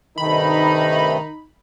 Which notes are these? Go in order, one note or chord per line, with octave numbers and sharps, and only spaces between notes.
G2 C3 D#3 A3 D#4 B5